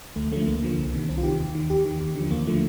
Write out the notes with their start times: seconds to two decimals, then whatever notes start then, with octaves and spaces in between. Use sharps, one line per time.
0.16 D2 A3
0.32 D3 F3 A3
0.47 D2 A#3
0.62 D3 F3
0.78 C2
0.93 C3 D#3
1.09 C2 C4
1.18 F4
1.23 C3 D#3 G4
1.40 D#2
1.55 D#3
1.70 D#2 G4
1.85 D#3
2.01 D#2
2.16 D3 F3
2.31 D#2 A#3
2.47 D3 F3 A3